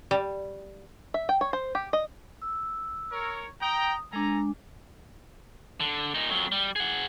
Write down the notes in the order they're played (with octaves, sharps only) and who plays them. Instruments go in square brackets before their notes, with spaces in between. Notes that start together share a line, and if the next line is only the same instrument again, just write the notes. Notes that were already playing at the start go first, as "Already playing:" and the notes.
[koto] G3
[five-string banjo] E5
G5
C#5
C5
G4
D#5
[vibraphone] E6
[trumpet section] A#4 C#5
[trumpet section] G5 A#5 [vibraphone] D#6
[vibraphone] G#3 D4 [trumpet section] A4 G#5 A#5
[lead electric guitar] D3
A#2 D#4
F2 F#3
G3
G#4 F#5